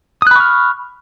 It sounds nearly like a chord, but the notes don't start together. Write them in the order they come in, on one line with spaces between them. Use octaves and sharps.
D#6 F#6 B5 C#6 F6